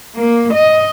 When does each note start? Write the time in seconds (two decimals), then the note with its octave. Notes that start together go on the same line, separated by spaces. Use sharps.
0.17 A#3
0.53 D#5